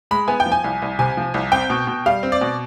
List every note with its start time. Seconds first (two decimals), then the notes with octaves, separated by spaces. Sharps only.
0.11 G#3 B5
0.28 B3 G#5
0.40 G5
0.46 F3
0.52 G#5
0.64 C2
0.82 C2
0.99 C3 G#5
1.17 F3
1.34 C2
1.52 C4 G5
1.70 B2
1.87 B2
2.06 G3 F5
2.23 C4
2.32 D5
2.41 B2